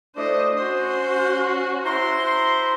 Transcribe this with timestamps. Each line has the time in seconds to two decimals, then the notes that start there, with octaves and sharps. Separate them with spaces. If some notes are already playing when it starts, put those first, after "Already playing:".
0.16 A3 D4 E4 F#4 C5 D#5
0.56 C#4 F#4 C5 C6 D#6
0.89 C6
1.85 E4 C5 A#5 C6